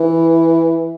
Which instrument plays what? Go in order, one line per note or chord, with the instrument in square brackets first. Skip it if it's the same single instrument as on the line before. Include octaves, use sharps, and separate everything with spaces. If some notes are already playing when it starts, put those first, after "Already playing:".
Already playing: [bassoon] E3